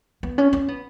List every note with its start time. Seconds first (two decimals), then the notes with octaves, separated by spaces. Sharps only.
0.23 B3
0.38 C#4
0.53 C#4
0.68 B3